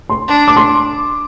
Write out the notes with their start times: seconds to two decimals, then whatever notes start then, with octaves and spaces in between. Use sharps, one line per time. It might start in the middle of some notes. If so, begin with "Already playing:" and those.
0.10 C6
0.28 D4
0.48 D6
0.56 C6